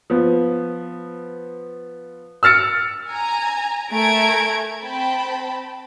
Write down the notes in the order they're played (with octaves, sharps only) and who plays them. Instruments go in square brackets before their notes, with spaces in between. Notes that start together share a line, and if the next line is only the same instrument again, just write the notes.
[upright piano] F3 B3
E6 F6 A6 C#7
[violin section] G#5 A#5
A3 A#4 G#5 A#5 G#6 D7
C4 G5 A5 B5